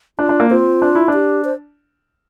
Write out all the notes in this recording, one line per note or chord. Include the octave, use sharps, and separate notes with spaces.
D4 F4
D4
A#3
C4 F4
D4
E4
D4
G4
C5